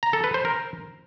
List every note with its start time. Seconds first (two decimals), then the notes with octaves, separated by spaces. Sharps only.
0.03 A#5
0.13 A4
0.24 B4
0.34 C5
0.45 A#4